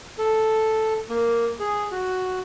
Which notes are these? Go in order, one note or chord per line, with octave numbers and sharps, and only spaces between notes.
A4
A#3
G#4
F#4